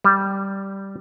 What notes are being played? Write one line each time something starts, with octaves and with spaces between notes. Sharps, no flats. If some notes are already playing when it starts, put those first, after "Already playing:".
G3